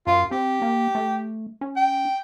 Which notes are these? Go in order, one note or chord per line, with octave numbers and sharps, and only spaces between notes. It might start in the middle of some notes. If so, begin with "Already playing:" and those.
F#2 F4
C4 G4
A#3
A3
C#4
G5